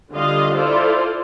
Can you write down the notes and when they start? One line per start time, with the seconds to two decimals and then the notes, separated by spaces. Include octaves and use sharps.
0.13 D3 G3 F4 D#5 F5
0.55 E4 F4 A4 C5 D5